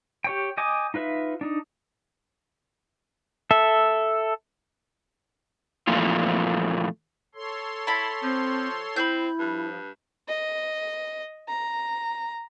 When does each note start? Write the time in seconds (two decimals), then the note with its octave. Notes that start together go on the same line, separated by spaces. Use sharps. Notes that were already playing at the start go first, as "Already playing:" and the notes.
0.24 G4 C#5 G5
0.57 D#5 G5 G#5 D6 D#6
0.94 D#4 F4 B4 E5
1.41 D4 D#4
3.51 A4 E5
5.87 F2 A#2 E3 A3 A#3 F4
7.35 A4 C#5 C6
7.87 E4 A5 B5
8.22 F3 C4
8.96 C4 E4 B5 G6
9.39 G2 F3
10.28 D#5
11.49 A#5